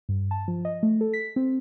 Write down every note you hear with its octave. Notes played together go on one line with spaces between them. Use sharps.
G2
A5
F3
D#5
A3
A4
B6
C4